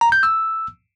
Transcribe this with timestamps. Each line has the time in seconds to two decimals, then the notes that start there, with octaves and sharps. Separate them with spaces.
0.01 A#5
0.12 G6
0.23 E6